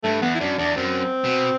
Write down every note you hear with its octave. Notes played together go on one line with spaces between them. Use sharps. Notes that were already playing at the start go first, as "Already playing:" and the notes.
G2 A3
E2 B3
E4
F#2 D4
E2 D4
F#2 C4
B2